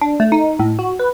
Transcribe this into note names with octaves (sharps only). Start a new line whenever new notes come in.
D4
A3
D#4
A2
F#4
B4